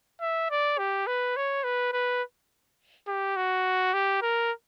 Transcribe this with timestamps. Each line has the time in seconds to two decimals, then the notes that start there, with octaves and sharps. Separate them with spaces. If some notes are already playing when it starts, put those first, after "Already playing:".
0.21 E5
0.51 D5
0.79 G4
1.07 B4
1.37 C#5
1.64 B4
1.93 B4
3.08 G4
3.37 F#4
3.94 G4
4.22 A#4